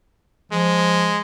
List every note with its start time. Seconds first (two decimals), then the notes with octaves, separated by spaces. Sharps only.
0.52 F3 G#3